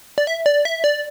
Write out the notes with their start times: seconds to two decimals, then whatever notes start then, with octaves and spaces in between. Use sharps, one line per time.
0.18 D5
0.27 E5
0.46 D5
0.65 E5
0.84 D5